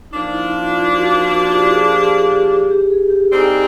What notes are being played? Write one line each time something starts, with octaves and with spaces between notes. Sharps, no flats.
F3 A#3 D4 D#4
E4
F4
F4
F#4
F4
F#4
G4
G#4
G4
G#4
G4
G4
G#4
G4
D3 G3 C4 D#4 G#4